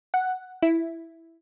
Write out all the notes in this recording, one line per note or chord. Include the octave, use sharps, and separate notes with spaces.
F#5
E4